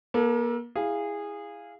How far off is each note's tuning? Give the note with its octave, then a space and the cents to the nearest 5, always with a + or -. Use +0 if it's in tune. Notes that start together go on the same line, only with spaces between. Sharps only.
A#3 +35 A4 +5
E4 +0 G#4 -20 F5 +0